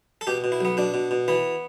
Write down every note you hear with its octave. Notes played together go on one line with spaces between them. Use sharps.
A4
B2 G4
B2
E4
B1 B3
B2 D4
B2
B2
E3 B3